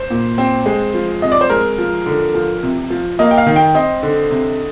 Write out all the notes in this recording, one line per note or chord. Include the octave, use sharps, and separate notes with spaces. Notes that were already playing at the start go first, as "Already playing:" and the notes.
Already playing: C5
A#2
C4
G#3
F3
C3 D#5
D5
C5
G#3 A#4
F3
D3
F3
C3
F3
A#3 D#5
G5
F5
D#3
G5
C4 D#5
D3
C3